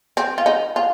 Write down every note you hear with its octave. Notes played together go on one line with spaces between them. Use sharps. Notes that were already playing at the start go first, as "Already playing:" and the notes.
C4
F4
D#4
F4